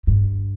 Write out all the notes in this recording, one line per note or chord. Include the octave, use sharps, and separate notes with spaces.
G2